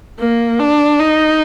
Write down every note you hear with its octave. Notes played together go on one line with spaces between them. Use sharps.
A#3
D4
D#4